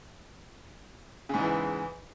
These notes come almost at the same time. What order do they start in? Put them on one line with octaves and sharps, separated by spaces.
C#3 G#2 E2 E3